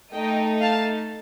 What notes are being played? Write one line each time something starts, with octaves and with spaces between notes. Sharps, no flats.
A3 D#4 A4 D#5 G5
F5 A5